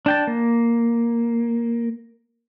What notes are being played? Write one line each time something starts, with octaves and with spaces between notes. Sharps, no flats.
D4 G5 A5
A#3